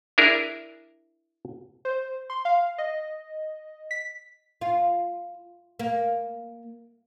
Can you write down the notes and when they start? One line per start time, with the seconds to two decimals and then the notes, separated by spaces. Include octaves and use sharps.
0.18 D4 E4 G#4 A#4
1.85 C5
2.30 C6
2.45 F5
2.78 D#5
3.91 B6
4.61 F4
5.79 A#3